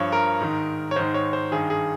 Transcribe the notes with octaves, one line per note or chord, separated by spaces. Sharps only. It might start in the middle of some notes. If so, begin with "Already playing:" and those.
Already playing: G2 F3 C#5
A#4
G#2 D#3
C#5
G#2 D#3 C5
C#5
C5
G2 D#3 G#4
G#4